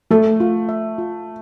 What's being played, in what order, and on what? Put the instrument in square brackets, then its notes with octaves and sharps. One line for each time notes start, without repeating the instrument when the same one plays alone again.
[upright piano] A3 [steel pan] A4
[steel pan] F4
E5
F4